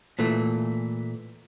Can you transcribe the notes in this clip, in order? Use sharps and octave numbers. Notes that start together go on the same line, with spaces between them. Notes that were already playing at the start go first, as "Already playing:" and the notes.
A#2 E3 A3